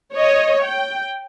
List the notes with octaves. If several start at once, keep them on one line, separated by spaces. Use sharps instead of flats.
C#5 D#5
G5